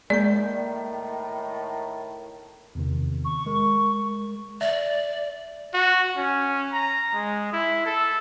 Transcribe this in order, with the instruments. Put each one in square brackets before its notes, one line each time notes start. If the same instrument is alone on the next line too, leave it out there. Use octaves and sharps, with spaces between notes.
[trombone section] A2 D#3 [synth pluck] G#3 A#3 G6 [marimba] D5
[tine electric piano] E2 C3 D#3
[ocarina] C#6
[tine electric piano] G#3 A#4
[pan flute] D5 [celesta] E5
[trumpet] F#4
C#4
A#5
G#3
E4
A4